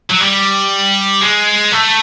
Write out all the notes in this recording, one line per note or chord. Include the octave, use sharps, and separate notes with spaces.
F#3
G3
G#3
A3